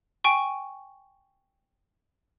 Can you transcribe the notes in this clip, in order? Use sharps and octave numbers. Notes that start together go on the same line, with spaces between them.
G5 G#5 C#6